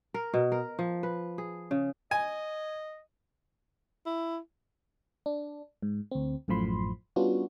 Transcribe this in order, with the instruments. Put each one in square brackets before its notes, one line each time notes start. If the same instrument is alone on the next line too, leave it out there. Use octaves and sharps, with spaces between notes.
[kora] A#4
B2
A#4
F3
B4
G#4
C#3
[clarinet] D#5 [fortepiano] G#5
[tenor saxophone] E4
[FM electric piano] D4
G#2
D2 C4
A1 F#2 A2 F3 B5 C6
G3 B3 C#4 D4 F4 F#4